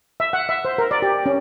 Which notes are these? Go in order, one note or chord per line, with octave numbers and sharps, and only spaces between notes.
E5
F#5
E5
C5
A#4
D5
G4
C#4